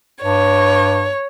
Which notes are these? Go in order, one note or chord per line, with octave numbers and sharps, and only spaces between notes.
G2 C#5